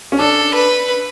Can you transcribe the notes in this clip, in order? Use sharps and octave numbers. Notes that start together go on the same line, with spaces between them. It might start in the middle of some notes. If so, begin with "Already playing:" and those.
C#4
D4 A4
B4